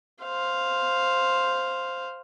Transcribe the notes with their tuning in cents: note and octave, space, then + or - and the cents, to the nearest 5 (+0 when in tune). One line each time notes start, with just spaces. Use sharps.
C5 +0 F5 +0